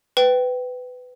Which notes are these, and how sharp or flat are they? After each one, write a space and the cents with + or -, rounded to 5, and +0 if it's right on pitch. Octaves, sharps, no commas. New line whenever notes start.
B4 +20 G5 -15